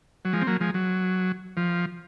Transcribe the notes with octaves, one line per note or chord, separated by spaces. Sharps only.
F#3
F3 G#3
C4
F#3 A#3
F3 G#3
F#3
F3